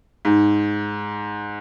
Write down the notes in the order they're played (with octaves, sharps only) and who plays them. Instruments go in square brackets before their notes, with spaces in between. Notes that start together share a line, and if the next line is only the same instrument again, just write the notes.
[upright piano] G#2